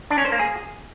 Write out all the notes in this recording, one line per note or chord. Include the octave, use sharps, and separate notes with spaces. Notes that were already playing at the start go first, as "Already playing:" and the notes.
D4
C#4
C5
A#3
G#4